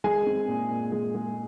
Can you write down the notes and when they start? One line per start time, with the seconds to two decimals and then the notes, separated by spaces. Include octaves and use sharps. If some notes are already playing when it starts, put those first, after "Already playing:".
0.04 G#3 G#4 G#5
0.27 C4
0.48 A#2
0.71 A#2
0.92 G#3
1.15 G#3